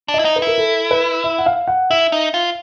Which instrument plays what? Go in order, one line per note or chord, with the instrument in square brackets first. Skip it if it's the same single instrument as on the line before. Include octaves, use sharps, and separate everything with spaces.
[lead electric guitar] D4
[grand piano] D#5
[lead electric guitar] E4
D#4
[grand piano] B4
[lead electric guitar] E4 [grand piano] A#4
[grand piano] A4
B4
E5
F#5
F5
F#5
[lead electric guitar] E4 [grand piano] E5
[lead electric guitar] D#4
F4